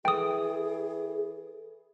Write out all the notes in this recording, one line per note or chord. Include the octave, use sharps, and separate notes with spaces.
E3 G#4 A4 G5 D#6